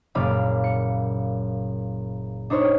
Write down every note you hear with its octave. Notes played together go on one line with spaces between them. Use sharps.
F#1 A#2 D5 F5 B5
C#7
D4 D#4 C5 C#5 C6